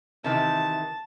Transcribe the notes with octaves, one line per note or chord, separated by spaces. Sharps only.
C3 D#3 E3 A5